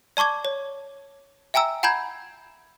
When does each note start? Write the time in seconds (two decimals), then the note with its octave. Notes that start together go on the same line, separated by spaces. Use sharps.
0.17 D5 A5 C#6 D6 G#6
0.45 C#5
1.54 E5 G5 G#5 A#5 E6
1.83 F#5 G#5 A#5 B5 G6 G#6